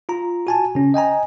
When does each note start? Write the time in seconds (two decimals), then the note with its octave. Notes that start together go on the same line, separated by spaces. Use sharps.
0.09 F4 A#5
0.47 F#4 G#5 A5
0.75 C#3 C#4
0.94 D#5 G5 G#5 A#5